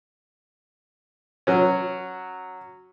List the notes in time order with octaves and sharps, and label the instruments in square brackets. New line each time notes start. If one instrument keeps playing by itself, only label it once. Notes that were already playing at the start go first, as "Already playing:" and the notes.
[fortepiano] F#3 C#4